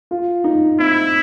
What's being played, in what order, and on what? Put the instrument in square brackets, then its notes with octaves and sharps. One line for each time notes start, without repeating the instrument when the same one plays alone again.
[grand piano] F4
D#4
[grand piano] C4 [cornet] E4